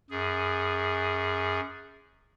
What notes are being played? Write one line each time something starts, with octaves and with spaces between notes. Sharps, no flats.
F#2 G#4